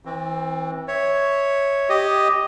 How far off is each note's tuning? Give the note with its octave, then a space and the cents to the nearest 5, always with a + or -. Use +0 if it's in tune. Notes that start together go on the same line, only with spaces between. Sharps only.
E3 -20 C4 +20
C#5 +0 E5 -5
G4 +0 D#5 +0